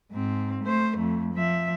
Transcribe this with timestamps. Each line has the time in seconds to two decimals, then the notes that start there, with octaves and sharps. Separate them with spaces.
0.11 G#2 C4
0.63 A3 C5
0.95 F2 A3
1.34 F3 E5